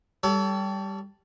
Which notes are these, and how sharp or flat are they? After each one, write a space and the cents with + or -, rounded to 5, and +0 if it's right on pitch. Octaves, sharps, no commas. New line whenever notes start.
G3 +0 A4 +0 C#5 +40